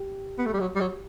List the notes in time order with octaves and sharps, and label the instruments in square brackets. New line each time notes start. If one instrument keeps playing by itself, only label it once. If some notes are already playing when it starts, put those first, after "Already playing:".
Already playing: [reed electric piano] G4
[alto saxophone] B3
A3
G3
F#3
G3
F#3